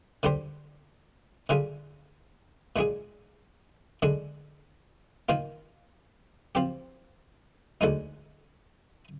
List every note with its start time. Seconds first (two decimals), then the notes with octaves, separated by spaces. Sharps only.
0.23 D3 G3 D4 G4 C5
1.49 D3 G3 D4 F4 G#4
2.76 A#2 G#3 D4 G#4
4.02 D3 G#3 D4
5.29 D#3 A#3 F4
6.55 F3 C4 G4
7.81 D2 D3 G#3 D#4